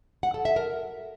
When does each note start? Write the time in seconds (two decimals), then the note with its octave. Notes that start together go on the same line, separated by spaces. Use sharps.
0.23 F#5
0.34 A4
0.45 E5
0.56 A#4